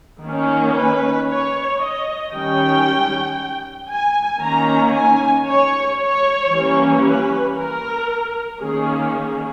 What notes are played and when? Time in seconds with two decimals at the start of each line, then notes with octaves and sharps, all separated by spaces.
0.23 D#3 A#3 C#4
0.76 B4
1.28 C#5
1.81 D#5
2.32 D#3 G3 C#4 G5
3.90 G#5
4.42 D#3 A#3 C#4 A#5
4.95 G#5
5.47 C#5
5.99 C#5
6.52 E3 G3 A#3 C#4
7.04 B4
7.57 A#4
8.61 D#3 A#3 C#4 G#4
9.14 G#4